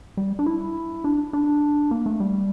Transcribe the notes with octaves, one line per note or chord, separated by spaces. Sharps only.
G3
D4
E4
D4
D4
A#3
A3
G3